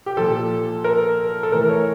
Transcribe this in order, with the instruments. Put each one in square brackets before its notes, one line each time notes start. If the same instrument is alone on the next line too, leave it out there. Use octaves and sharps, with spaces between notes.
[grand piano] G4
A#2 F3 A4
A#4
A4
A2 E3 A#4
C#5